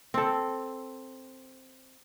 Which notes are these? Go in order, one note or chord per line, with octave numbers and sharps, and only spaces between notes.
C4 A4